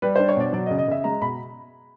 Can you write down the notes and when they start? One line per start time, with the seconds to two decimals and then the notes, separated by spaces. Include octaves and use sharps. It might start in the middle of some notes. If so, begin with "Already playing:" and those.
0.02 G3 B4
0.16 D4 C5
0.28 C#5
0.37 B2 D5
0.53 F#3 D5
0.66 D#5
0.70 C#3
0.78 D#5
0.88 C#3 E5
1.04 G#3 A#5
1.21 B2 B5